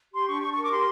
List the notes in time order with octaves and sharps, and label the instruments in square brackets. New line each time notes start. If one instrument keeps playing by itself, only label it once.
[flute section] G4 C6
D4 C#6
D4 C#6
A#4 C#6
D6
G4 C6